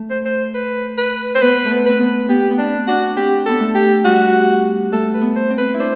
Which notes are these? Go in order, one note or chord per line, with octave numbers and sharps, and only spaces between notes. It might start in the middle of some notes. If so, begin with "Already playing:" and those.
Already playing: A3
C5
C5
B4
B4
C5
B3 B4
A3
B3
C4 B4
B3
B3 G4
B3
C4 D4
D4 F#4
C4 G4
B3 A4
A3
G4
G3 F#4
A3 A4
B4
B3
C5
C4
B4
E4
D4 C5